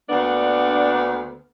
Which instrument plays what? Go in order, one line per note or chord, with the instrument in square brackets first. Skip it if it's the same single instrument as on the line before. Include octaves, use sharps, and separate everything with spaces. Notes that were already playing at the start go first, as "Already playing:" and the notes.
[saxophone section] D2 A#3 B3 D4